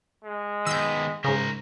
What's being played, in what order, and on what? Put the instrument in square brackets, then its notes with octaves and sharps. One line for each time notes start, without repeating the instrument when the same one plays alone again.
[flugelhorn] G#3
[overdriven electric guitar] D#3 B3 [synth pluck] E6 G6
[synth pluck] G#2 C#3 [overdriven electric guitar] A#4 C5